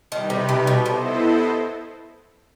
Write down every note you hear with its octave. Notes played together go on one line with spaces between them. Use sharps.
D#3 G3 D#4 G4 B4
C3
C3
B2
C3 B3 E4 A4 C5 D#5